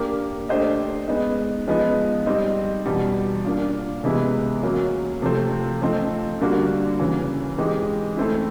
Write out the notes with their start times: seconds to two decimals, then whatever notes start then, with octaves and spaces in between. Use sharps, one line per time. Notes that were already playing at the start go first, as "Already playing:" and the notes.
Already playing: A#3 D4 G4 A#4
0.49 A3 D4 G4 C5 D#5
1.08 G#3 B3 D#4
1.67 F3 G#3 B3 D#4
2.26 G3 C4 D#4
2.86 E2 B2 G3
3.44 A#3 D4 F4
4.04 C3 E3 G#3 B3 E4
4.62 F#3 A#3 C#4
5.22 C3 F3 A3 C4
5.82 F3 A3 C4 D#4
6.41 D3 G3 A#3 D4 F#4
6.99 F#2 C#3 E3
7.58 E3 G#3 C4 D#4 G4
8.17 A3 C4 E4